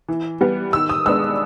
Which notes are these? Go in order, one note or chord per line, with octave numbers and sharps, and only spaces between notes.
E3
G3 B3
D#3 E6
D#6
G#3 B3 D4 E6